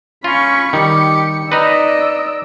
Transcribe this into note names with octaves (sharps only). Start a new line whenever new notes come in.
C#4 F4 B5 C#6
D#3 G3 G4 C#7
D#4 B4 D5 D#5 E6